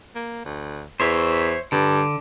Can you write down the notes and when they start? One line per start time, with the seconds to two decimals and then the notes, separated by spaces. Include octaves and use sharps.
0.15 A#3
0.44 D2
1.00 E2 C5 C#5 E5
1.72 G2 D3